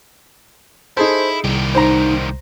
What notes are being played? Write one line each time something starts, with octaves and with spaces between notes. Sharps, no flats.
D#4 E4 G#4 A4 C5
C2 D#3 G3
D#4 C5 A#5